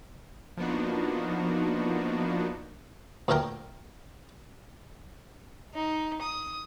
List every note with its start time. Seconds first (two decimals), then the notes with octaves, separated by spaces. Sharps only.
0.57 F3 A#3 B3 D4 D#4 F#4
3.28 D2 A#2 A3 A#4 G5
5.75 D#4
6.21 D#6